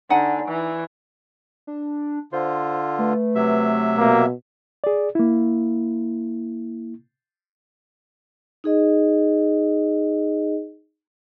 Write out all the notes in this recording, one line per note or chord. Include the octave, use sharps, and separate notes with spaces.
D3 D#4 F#5 G#5
E3
D4
D3 F4 C5
A3 B4
C3 F#3 E5
B2 A#3
G#4 D5
A#3 E4
D#4 G#4 D#5